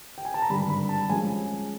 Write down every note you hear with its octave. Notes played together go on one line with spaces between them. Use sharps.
G5
G#5
A5
A#5
G#1 G2 D3 G3 B5
B5
A5
F3 G#3 C#4 G#5